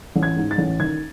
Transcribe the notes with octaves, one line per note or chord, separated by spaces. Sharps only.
A1
G#6
G#2
A6
A1
D#3 G#6